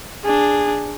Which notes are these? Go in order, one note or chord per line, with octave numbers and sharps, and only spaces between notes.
D4 G#4